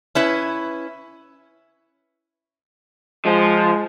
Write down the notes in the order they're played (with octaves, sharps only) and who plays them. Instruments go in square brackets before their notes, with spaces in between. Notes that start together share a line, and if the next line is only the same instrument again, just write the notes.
[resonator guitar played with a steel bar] C#4 E4 B4
[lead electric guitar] F3 [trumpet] G#3